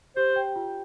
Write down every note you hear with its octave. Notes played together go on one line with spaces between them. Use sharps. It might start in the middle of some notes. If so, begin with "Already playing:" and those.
G4 C5
G5
F4